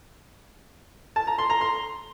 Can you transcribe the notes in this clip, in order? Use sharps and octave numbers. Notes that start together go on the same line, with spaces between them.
A5
A#5
C6
A#5
C6